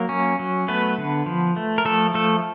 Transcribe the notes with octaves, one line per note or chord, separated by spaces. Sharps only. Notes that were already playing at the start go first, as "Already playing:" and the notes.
Already playing: F#3 A#3 A#4
C#4
F#3
A3 B3 B4
D3
F3
A3
A#4
F3 A3 A4
F3 A3 A4